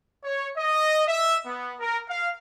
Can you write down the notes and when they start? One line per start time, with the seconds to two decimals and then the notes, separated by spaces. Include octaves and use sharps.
0.24 C#5
0.57 D#5
1.08 E5
1.46 B3
1.80 A#4
2.10 F5